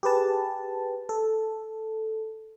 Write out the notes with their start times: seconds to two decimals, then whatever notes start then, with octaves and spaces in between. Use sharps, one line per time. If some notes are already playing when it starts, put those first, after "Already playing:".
0.03 G4 G#4 B4 A5
1.09 A4